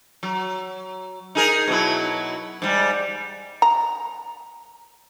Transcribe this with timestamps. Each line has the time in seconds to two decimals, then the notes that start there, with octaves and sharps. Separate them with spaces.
0.23 F#3
1.35 D#4 G#4 A#4
1.67 B2 F#3 E4
2.62 G#2 G3
3.62 A#5